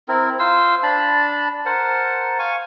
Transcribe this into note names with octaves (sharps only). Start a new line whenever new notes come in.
C4 E4 A#4
F4 C5 C6 E6
D4 A5 B5
A#4 C5 F#5 A5
F5 G#5 C#6